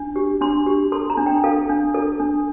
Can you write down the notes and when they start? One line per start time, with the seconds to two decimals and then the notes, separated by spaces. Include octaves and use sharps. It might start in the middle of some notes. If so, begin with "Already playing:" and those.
Already playing: D4
0.16 G4
0.41 D4 C6
0.67 G4
0.92 A4 C6
1.10 A#5
1.17 D4
1.26 G5
1.44 A4 F5
1.69 D4
1.94 A4
2.20 D4